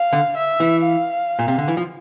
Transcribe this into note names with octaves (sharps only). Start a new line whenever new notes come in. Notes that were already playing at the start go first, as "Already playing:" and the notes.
Already playing: F5
D3
E5
E3
F5
A#2
C3
D3
E3
F3